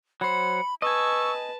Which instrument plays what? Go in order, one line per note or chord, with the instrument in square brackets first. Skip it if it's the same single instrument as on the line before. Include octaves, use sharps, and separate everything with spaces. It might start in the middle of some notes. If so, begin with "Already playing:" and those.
[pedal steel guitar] F#3 C5 [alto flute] B5 [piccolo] C#7
[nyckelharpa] B4 A5 [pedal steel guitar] D#5 G#5 [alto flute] C#6 [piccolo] E6